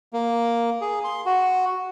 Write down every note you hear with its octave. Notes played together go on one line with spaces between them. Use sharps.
A#3
G#4
C6
F#4